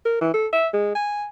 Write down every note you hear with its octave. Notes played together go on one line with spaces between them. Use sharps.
A#4
E3
A4
E5
G#3
G#5